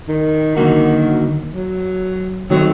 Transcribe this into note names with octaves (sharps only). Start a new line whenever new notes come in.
D#3
D3 D#3 F#3 A#3 F#4
F#3
D#3 F#3 A3 C4